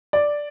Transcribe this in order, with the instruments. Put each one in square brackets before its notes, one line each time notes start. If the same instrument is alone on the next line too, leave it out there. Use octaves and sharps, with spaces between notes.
[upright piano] D5